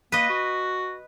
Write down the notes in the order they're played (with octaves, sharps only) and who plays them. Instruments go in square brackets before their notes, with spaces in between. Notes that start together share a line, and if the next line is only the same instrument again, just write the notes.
[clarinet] A#3 [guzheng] B4 D#5
[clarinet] F#4